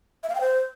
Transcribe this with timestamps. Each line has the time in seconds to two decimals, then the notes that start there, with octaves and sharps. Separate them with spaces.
0.23 E5
0.29 F5
0.35 G5
0.41 C5